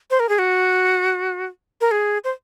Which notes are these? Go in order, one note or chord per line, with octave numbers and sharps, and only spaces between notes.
C5
A#4
G#4
F#4
A#4
G#4
C5